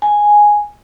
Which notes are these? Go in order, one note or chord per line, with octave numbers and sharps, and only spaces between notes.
G#5